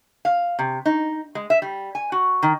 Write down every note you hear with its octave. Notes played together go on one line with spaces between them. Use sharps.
F5
C3
D#4
G#3
E5
G3
G#5
F#4
D#3